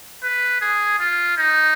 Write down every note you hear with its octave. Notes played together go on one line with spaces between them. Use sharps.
B4
G#4
F4
D#4